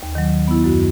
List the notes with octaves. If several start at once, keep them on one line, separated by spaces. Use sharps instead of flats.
D#2
D#3 F#3
B3 E4
F#2 F#4